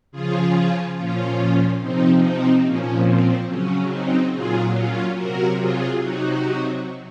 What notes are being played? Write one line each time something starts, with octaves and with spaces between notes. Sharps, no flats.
C#3 F3 F4 G#4
A#2 F3 C#4 F4
C3 F3 C4 D#4
C4 D#4
A#2 F3 C#4
C4
C#3 F#3 C#4
C4 D#4
A#2 F#3 F4 G#4
C#4 F4
C3 F#3 F#4 A#4
F4 G#4
C3 F#3 D#4 F#4